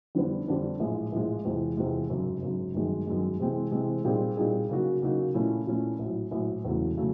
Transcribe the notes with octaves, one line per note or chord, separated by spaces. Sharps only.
F2 D3 G3 B3 D4
F2 D3 G3 B3 D4
A#1 A2 F3 G#3
A#1 A2 F3 G#3
E2 C3 F3 G#3
E2 C3 F3 G#3
G#1 F#2 C#3
G#1 F#2 C#3
G1 F#2 D#3 G#3
G1 F#2 D#3 G#3
C3 E3 G#3 C4
C3 E3 G#3 C4
A#2 G3 C4 D#4 G#4
A#2 G3 C4 D#4 G#4
C#3 F#3 A#3 D#4 F#4
C#3 F#3 A#3 D#4 F#4
A#2 F3 A3 C#4 E4
A#2 F3 A3 C#4 E4
A#1 A2 F#3
A#1 A2 F#3
E1 E2 C#3 F#3 A3
C#3 F#3 A3